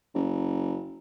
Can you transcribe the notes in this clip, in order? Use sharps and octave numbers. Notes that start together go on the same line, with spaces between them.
F#1